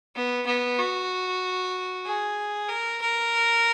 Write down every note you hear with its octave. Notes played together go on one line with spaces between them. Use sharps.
B3
B3
F#4
G#4
A#4
A#4